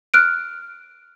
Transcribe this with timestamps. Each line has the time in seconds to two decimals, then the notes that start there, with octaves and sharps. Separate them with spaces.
0.14 F6 F#6 D7